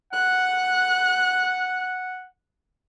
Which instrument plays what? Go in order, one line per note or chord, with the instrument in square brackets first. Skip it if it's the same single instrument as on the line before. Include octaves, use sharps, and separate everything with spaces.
[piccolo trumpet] F#5 [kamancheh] F#6